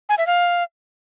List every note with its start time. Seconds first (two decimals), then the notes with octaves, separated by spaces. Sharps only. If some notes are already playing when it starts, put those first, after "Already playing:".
0.09 G#5
0.18 E5
0.27 F5